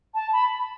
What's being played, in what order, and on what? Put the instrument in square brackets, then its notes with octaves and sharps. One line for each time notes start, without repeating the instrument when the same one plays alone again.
[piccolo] A5
B5